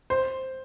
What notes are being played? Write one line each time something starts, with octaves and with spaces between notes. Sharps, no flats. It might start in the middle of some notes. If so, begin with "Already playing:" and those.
C5